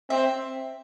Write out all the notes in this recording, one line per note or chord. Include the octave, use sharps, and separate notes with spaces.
C4 E5